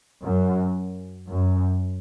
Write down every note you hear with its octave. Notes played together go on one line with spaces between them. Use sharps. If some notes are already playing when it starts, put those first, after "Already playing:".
F#2
F#2